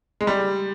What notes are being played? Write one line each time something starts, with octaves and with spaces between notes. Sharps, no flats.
G#3
G3